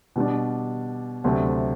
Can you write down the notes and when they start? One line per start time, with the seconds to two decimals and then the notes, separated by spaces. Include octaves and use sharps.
0.16 B2 G3 D4
1.24 D2 C3 F#3 A3 C4